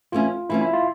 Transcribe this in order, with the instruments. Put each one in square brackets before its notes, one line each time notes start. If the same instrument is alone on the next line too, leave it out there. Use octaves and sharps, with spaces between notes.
[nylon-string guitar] E3 A3 C#4 [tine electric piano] F4
[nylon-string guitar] E3 A3 C#4 [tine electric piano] E4
[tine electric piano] E4
F4